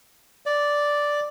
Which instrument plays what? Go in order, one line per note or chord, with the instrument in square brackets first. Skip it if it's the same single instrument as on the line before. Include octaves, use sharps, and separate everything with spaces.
[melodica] D5